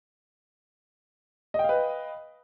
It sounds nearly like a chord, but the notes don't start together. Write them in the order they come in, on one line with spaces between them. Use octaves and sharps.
D#5 G5 F5 B4